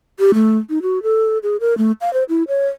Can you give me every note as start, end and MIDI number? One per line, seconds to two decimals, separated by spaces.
0.19 0.31 67
0.34 0.58 57
0.70 0.82 63
0.82 1.02 66
1.03 1.38 69
1.43 1.57 68
1.60 1.77 70
1.78 1.92 57
2.01 2.12 77
2.13 2.24 72
2.29 2.43 64
2.48 2.67 73